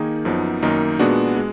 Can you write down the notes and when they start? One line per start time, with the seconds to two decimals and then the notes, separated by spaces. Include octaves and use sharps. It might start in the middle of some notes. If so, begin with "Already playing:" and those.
Already playing: D#3 A#3 D#4 G#4
0.25 F#2 F3 B3 D#4
0.62 F#2 D#3 A#3 D#4 A#4
0.99 A#2 G#3 B3 D4 F#4
1.36 G#3